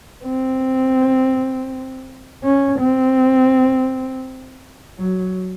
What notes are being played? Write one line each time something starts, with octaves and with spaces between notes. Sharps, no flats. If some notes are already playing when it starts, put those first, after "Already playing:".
C4
C#4
C4
F#3